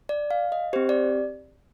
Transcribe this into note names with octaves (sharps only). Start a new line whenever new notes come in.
D5
F5
D#5
C4 G4 C5
D5